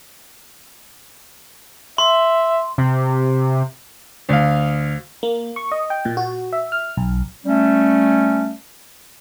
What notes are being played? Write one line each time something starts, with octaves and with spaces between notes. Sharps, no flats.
E5 C6
C3
D2 F5
A#3
C#6
D#5
G5
A#2
F#4
E5
F6
B1
G3 A3 C#4